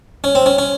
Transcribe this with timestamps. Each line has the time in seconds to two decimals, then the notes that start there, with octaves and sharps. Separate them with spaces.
0.24 C#4
0.35 C4
0.46 C#4
0.58 C#4